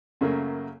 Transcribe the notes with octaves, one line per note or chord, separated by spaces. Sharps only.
F#2 C#3 A3 A#3